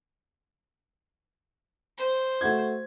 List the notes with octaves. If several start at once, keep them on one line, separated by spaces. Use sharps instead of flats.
C5
A3 F#4 G#6